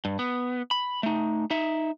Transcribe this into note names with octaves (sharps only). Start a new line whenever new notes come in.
G2
B3
B5
A3 D#4
D#4 E5